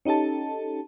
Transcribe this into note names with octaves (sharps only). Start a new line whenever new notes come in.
C#4 D#4 G4 A4 A5